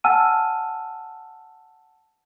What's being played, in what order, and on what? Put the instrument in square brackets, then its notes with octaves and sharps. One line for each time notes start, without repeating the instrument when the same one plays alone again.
[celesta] F#5 G#5 A5 E6 F6 D#7